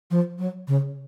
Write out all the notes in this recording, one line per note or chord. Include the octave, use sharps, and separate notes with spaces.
F3
F#3
C#3